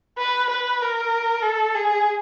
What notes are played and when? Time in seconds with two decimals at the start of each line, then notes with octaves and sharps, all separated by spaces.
0.18 B4
0.50 B4
0.81 A#4
1.43 A4
1.75 G#4